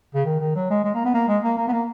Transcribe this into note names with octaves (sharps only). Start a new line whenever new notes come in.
C#3
D#3
D#3
F#3
G#3
G#3
A#3
B3
A#3
G#3
A#3
A#3
B3
A#3